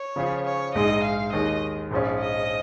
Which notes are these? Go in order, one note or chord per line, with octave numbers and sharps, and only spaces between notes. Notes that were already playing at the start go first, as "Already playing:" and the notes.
Already playing: C#5
C#3 F3 C#4 F4 G#4
C#5
A#1 G#2 G#3 D#4 D#5
F5
D#2 D#3 G#3 D#5
A#1 G#2 F3 C#4
D#5